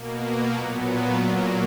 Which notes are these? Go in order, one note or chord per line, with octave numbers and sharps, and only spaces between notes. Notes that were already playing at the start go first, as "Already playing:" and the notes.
Already playing: B2 A#3
D#5 F#5
A#2 F#3 B3 F#5 A#5
F5 G#5
A#2 F#3 A#3 D#5 F#5